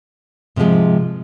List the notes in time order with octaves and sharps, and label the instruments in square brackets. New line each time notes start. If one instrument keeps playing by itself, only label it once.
[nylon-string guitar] G#2 C3 E3 F3 G#3